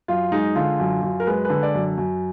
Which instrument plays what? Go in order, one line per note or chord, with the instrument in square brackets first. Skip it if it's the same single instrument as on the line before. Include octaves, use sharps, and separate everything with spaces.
[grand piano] F#2 F4
G#3 D#4
D3 F4
F#2
F#2
A#4
G#3 B4
B4
D3
D5
F#2
F#2